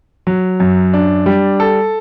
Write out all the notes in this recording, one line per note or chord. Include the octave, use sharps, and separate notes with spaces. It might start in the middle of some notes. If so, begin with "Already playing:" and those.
F#3
F#2
D4
G3
A4